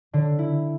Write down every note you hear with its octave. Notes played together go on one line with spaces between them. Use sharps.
D3
E4